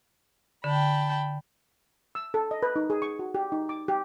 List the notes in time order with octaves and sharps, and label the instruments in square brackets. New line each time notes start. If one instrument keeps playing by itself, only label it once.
[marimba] D3 [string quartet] G5 A5 B5
[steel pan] E6
A4
D#5
B4
D#4
G#4
C#6
F#4
G4
D#4
D6
G4